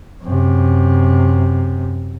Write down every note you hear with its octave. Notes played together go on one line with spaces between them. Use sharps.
F#2 C3